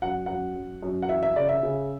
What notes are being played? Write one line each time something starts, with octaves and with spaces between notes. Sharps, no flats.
F#2 F#5
F#2 F#5
F#2
F#2
F#5
E3 E5
E5
C#3 D5
E5
C#3